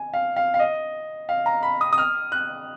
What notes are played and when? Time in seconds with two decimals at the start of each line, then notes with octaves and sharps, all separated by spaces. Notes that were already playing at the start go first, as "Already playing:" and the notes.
Already playing: G#5
0.14 F5
0.36 F5
0.54 F5
0.59 D#5
1.29 F5
1.46 A#5
1.63 B5
1.81 D#6
1.93 D#6
1.98 F6
2.32 F#6